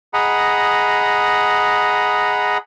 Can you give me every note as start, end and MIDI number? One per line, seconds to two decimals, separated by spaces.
0.14 2.58 68
0.14 2.58 75
0.14 2.58 78
0.14 2.58 82
0.14 2.58 83